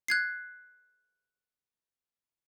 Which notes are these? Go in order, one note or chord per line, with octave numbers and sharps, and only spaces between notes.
F#6 G#6 C7